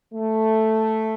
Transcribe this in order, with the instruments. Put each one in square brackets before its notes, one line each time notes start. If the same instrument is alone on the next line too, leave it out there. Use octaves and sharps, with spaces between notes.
[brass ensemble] A3